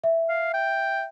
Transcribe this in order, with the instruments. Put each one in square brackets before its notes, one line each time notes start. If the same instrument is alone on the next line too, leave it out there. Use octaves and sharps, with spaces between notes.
[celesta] E5
[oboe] F5
G5